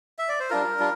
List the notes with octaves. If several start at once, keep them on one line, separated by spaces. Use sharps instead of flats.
E5
D5
C5
G3 D4 F4 A#4
G3 D4 F4